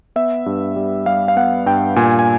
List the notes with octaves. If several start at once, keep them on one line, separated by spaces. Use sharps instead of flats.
B3 E5
G2
G3
G3 F5
F5
B3 F#5
G2 G5
A#2 G#5
G#5